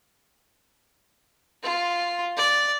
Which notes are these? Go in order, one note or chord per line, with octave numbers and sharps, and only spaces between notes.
F4
D5